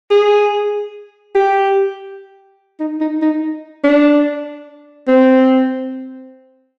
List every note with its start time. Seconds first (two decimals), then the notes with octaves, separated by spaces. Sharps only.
0.11 G#4
1.35 G4
2.80 D#4
3.01 D#4
3.22 D#4
3.84 D4
5.08 C4